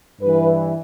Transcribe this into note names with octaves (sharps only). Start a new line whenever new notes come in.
G2 E3 B4